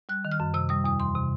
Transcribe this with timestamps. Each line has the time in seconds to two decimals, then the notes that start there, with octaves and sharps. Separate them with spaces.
0.09 G3 F#6
0.25 D#3
0.32 F6
0.40 F#2
0.54 C3 E6
0.69 G3 D#6
0.84 E2 D#6
1.00 E3 C6
1.15 C3